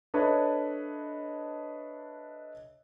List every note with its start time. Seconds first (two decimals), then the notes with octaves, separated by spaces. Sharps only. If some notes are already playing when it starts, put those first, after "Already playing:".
0.14 D4 A4 B4 C#5 D#5 E5